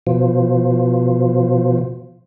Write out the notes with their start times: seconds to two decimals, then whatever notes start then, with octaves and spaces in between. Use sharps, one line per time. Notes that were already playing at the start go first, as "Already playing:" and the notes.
0.07 B2 F3